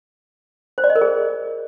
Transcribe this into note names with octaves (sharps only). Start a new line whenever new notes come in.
C5
D5
D#5
A#4
G#4